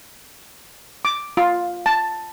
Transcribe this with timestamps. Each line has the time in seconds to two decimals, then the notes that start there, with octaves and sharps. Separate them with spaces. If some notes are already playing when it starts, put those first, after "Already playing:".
1.05 D6
1.37 F4
1.86 A5